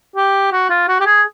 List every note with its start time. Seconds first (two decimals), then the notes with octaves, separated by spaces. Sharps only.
0.16 G4
0.52 F#4
0.70 F4
0.88 F#4
1.00 G4
1.06 G#4